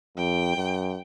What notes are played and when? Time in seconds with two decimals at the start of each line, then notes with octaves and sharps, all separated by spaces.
0.17 F2 G5
0.56 F#2